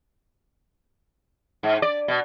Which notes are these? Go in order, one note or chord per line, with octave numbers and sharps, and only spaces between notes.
G#2
D5
B2